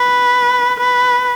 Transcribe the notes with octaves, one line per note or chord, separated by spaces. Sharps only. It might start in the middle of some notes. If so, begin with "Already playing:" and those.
Already playing: B4
B4